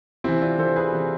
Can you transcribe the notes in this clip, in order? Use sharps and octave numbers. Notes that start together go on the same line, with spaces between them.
C3 E3 C4 E4
D4 F4
C3 E3 A4 C5
G#4 B4
C3 E3